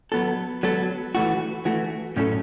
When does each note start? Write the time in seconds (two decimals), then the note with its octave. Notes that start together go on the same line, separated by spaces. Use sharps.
0.12 F#3 B3 A4
0.63 F#3 B3 A4
1.15 E3 A3 F#4
1.65 E3 A3 F#4
2.16 A2 F#3 C#4 A4